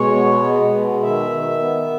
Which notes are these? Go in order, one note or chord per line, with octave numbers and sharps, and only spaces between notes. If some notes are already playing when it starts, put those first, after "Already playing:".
Already playing: B2 G#3 C#5
B3
G#3
B2
D#3 E5
D#3
B3